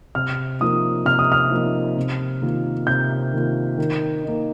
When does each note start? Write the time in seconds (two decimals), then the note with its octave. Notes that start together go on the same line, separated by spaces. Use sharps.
0.15 C3 F6
0.60 F3 A#3 D#4 D#6
1.05 C3 F6
1.19 D#6
1.32 F6
1.51 F3 A#3 D#4
1.97 C3
2.42 D#3 A#3 F4
2.87 C3 G6
3.33 D#3 A#3 F4
3.78 D#3
4.24 A#3 D#4